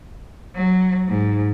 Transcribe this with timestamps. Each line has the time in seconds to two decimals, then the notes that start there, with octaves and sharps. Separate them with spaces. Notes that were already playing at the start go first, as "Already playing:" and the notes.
0.55 F#3
1.08 G#2